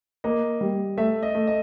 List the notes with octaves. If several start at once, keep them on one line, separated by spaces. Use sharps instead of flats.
A#3 D#5
G3
A3 E5
D#5
A3
D#5